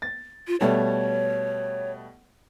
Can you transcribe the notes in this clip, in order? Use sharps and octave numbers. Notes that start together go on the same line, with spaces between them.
A6
F4
B2 G3 A3 C#5